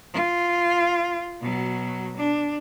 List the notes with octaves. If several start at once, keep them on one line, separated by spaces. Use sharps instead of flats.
F4
B2 F#3
D4